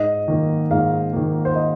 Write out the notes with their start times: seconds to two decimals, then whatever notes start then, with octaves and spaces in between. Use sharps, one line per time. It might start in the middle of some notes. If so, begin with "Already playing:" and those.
Already playing: G#2 D#5
0.28 D#3 A#3
0.71 G#2 F5
1.13 D#3 A#3
1.45 C5
1.55 D#5